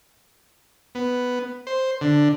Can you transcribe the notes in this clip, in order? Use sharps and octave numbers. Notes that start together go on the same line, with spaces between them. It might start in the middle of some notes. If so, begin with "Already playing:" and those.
B3
C5
D3